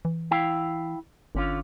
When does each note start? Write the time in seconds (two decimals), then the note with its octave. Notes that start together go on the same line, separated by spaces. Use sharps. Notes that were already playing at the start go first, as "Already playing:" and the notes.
0.05 E3
0.31 E4 F5 G5
1.35 G1 D3 C#4 F4